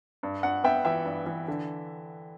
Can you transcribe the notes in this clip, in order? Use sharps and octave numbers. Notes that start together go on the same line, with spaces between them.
G2
G2 F#5
B3 E5 G5
E3 E5 G5
G2
E3
D3